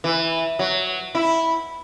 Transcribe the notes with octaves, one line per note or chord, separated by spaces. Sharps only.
E3
F#3
E4